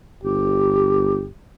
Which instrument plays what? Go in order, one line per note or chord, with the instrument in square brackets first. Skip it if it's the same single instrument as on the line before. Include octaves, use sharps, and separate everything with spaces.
[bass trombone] G1 [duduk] G4